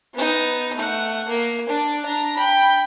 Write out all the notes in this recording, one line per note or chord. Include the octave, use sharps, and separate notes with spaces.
B3 D#4
A3 F#5
A#3
D4 D5
D4 A#5
G5 B5